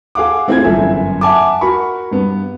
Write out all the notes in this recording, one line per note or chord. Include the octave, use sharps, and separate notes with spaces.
G#4 A4 F5 F#5 D6
A3 C4 E4 F4 G#4 G#6
G1 F#2 E3 A4 E5 G#5
E5 F#5 G#5 A5 D6
F#4 A#4 B5 C#6
G2 B3